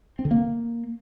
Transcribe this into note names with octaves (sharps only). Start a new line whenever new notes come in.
C4
D3
A#3